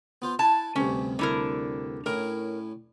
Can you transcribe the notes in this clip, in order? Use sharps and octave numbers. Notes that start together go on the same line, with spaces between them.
B3 F4 C5
E4 B4 G#5 A5
D2 G2 C3 C#4
D3 E4 A#4
A2 C#4 E4 A#4